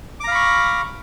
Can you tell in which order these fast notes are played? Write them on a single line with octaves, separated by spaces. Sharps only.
D6 A#5 F5 B5 C#6